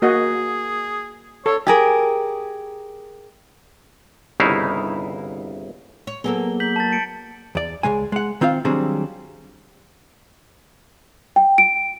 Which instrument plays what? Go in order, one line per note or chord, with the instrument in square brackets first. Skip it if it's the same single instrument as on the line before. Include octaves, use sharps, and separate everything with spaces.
[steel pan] A#3 F#4 D#5 [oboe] G#4
[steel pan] A4 [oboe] C#5
[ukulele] G4 G#4 A#4
[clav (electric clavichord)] G1 C2 C#3 D#4 E4 F5
[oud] C#5
[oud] F#3 A#3 A4 [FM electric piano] B3 G#4 [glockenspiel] G7
[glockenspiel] G6 B6 F#7
A5 A6
C#7 D7
[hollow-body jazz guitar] E2 D5
C#2 C#3 G#3 G#5
G#3 F#5
D#3 C4 F4 C5 D5 F5
D#3 F#3 G3 C4 D4 G#4
[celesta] G5
D7